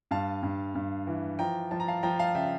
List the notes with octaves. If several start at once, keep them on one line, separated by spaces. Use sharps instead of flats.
G2 F5 A5
G2
G2
E3
F3 G5 A#5
F3 A5
A#5
F5 A5
F3 G5 A#5
F5 A5
C#3 E5 G5